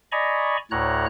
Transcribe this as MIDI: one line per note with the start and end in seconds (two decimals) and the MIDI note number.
0.12 0.57 74
0.12 0.57 75
0.12 0.57 80
0.12 0.57 82
0.12 0.57 83
0.12 0.57 85
0.71 1.06 38
0.71 1.06 45
0.71 1.06 73
0.71 1.06 82
0.71 1.06 90